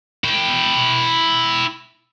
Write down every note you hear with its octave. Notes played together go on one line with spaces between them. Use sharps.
E4 G5